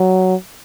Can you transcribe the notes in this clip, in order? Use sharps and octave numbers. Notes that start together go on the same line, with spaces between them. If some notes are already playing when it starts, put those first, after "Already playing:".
Already playing: F#3